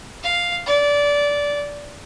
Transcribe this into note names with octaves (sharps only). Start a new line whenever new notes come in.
F5
D5